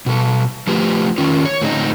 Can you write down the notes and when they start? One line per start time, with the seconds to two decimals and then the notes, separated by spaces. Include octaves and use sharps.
0.06 B2 A4
0.67 F3 A3 F4 G4 B4
1.18 D#3 C#4 F4
1.45 C#5
1.62 A2 D3 F3 C4 D#4 D#5